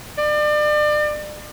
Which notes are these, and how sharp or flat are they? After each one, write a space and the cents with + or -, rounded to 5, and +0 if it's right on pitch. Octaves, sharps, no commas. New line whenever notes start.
D5 +35